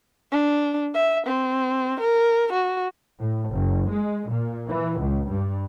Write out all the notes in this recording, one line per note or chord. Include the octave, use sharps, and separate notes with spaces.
D4
E5
C4
A#4
F#4
A2
F#1
G#3
A#2
E3
C#2
G2